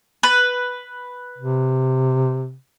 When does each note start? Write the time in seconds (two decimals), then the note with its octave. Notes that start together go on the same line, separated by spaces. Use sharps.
0.23 B4
1.38 C3